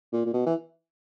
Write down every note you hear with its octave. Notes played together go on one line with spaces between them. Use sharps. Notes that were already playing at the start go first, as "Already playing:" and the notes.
A#2
A#2
B2
E3